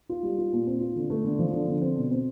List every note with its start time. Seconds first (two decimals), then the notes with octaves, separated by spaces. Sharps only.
0.09 F4
0.23 G3
0.38 F4
0.53 A#2
0.67 C4
0.81 F4
0.96 D3
1.10 A3
1.24 D3
1.39 F3
1.53 D3
1.68 D3
1.81 C4
1.96 B2
2.11 C4